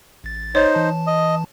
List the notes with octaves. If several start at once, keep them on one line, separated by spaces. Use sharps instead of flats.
A1 A6
D#4 C5 C#5
E3 A5
D#5